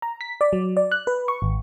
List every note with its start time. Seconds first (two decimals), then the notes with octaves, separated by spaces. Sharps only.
0.02 A#5
0.21 B6
0.41 D5
0.53 F#3
0.77 D5
0.92 F#6
1.07 B4
1.28 C#6
1.42 G#1